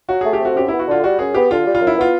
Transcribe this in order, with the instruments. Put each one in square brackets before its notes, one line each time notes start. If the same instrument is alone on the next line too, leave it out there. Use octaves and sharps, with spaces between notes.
[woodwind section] F#3 [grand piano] F#4
[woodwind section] A3 [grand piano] G#4
[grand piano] G4
[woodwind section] C4 [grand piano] F#4
[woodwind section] F#2 [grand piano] G4
[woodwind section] B3 [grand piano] E4
[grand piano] F#4
[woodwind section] D3 [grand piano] F4
[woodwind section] G3 [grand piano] F#4
[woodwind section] F#2 [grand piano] G#4
[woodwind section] B3 [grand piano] G4
[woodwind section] D3 [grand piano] F4
[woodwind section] G3
[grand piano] F4
[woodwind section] F#2
[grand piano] E4
[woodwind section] B3 [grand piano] F4